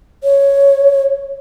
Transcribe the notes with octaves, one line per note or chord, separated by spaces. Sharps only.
C#5